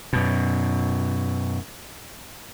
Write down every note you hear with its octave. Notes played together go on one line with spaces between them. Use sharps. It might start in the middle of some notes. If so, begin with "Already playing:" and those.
F#2 B2